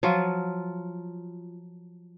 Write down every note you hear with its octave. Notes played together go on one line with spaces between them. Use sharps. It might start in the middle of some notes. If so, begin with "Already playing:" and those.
F3 F#3 F4